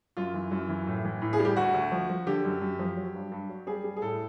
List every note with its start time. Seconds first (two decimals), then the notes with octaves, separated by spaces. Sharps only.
0.17 F#2 F4
0.34 E3
0.51 F#2
0.69 E3
0.87 A2
1.04 E3
1.22 A2
1.33 G#4
1.39 G3
1.45 G4
1.56 D2 F#4
1.74 D2
1.92 F3
2.10 F3
2.27 D3 G4
2.44 F#2
2.61 F#2
2.79 F3
2.97 F#3
3.14 G2
3.32 G2
3.49 F#3
3.67 G3 G#4
3.84 G3
3.97 G#4
4.02 A2 A4